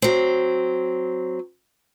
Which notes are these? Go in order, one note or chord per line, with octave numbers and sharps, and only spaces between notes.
F#3 C4